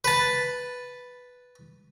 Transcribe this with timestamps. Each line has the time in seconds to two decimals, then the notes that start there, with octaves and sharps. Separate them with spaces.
0.04 B4 A5